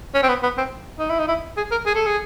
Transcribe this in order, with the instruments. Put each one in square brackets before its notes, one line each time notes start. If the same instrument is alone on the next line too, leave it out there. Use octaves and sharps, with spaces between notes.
[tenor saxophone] C#4
C4
B3
B3
C4
D#4
E4
D#4
E4
G#4
A#4
G#4
A4
G#4